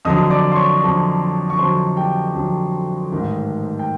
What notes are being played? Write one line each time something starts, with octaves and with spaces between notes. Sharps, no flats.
F2 D3 F#3 D#5 D#6
D5 D6
C6
C#5 C#6
F2 D3 F#3
C#6
F2 D3 F#3 C5 C6
G4 G5
F2 D3 F#3
A1 G#2 D#3
G5